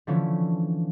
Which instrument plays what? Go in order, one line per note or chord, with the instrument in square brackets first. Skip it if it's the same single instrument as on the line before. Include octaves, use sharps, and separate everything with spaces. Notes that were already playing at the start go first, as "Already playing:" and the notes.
[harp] D3 E3 F3 A3 C#4